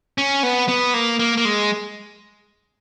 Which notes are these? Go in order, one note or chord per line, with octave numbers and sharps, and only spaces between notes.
C#4
B3
B3
A#3
A#3
A#3
G#3